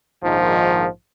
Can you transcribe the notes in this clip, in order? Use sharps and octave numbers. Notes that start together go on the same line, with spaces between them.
A#1 G#2 D#3 F3